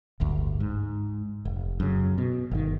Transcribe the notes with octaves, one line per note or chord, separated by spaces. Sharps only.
D1 G1 D2
G#2
F1
F#2 C#3
B2
G1 D#3